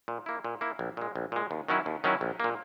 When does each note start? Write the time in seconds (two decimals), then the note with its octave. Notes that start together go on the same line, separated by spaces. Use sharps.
0.08 A#2
0.26 A#3 E4
0.45 A#2
0.61 A#3 E4
0.79 A#1
0.97 A#2 G#3
1.16 A#1
1.32 A#2 G#3
1.51 D#2
1.68 D#3 F#3 C#4 E4
1.86 D#2
2.04 D#3 F#3 C#4 E4
2.21 A#1
2.40 A#2 A#3